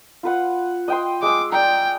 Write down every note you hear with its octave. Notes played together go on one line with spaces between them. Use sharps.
F4 B4 F#5
D#5 G5 C6
G#3 D6 E6
D5 G5 A#5